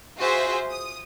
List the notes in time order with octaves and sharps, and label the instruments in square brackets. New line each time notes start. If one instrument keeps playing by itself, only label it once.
[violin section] F4 F#4 G#4 C5 E5
D#6